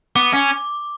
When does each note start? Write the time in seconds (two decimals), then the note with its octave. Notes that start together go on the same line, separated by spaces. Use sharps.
0.16 B3 D6
0.34 C#4